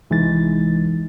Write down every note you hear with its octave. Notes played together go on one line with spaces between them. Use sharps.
C2 E3 G#3 D#4 A6